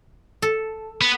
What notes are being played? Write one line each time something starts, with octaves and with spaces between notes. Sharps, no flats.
A4
B3